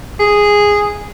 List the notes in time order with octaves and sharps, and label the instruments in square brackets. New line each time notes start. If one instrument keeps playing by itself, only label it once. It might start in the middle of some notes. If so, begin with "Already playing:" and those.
[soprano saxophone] G#4